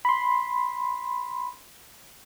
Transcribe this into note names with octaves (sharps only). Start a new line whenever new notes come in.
B5 C6